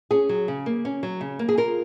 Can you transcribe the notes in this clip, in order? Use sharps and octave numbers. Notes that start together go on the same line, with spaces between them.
C#4 G#4
F#3
C#3
A#3
C#4
F#3
C#3
A#3
G#4
F4 A#4